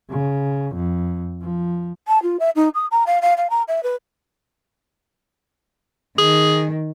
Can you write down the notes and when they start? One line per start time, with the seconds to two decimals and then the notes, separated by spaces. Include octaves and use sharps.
0.10 C#3
0.75 F2
1.42 F3
2.08 A5
2.22 F4
2.39 E5
2.55 D#4
2.74 D#6
2.91 A#5
3.06 F5
3.22 F5
3.37 F5
3.50 A#5
3.68 E5
3.83 B4
6.18 D#3 G#4